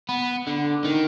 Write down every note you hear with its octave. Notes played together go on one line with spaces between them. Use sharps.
B3
D3
D#3